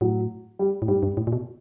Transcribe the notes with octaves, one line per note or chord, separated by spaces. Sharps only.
A2 F#3
G3
A2
G#2 G3
G2
A2
A#2
B2